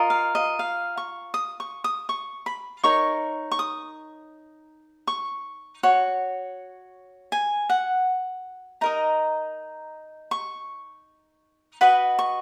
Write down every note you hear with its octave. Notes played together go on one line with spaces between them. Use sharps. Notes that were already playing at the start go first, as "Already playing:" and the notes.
Already playing: F4 A#4 D#5
F5
D#5
F5
C#6
D#6
C#6
D#6
C#6
B5
D#4 A#4 C#5 C#6
C#6
D#6
C#6
F#4 C#5
G#5
F#5
D#4 A#4 D#5 A#5
C#6
F#4 B4 D#5 B5
C#6